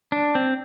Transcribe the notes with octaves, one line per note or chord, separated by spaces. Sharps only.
D4
C4